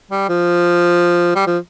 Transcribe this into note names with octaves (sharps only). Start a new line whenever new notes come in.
G3
F3
G3
F3